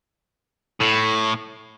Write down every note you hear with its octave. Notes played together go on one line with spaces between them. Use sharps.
A2